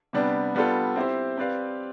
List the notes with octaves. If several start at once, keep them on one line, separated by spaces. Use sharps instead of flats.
C3 G3 B3 D4
G3 B3 D4 F4 A4
C4 E4 G4 C5
C4 G4 B4 D5 F5